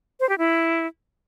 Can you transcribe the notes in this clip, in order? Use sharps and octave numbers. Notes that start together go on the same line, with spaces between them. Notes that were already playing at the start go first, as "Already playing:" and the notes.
C5
G4
E4